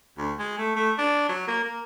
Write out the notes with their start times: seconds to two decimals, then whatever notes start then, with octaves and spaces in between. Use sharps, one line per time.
0.18 D2
0.39 G#3
0.58 A3
0.76 A3
0.98 D4
1.29 F#3
1.48 A#3
1.64 A#3